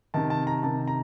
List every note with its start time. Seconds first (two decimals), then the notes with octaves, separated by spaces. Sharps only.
0.14 C3 D#3 A5
0.30 A5
0.47 A#5
0.63 C3 D#3 A5
0.88 A#5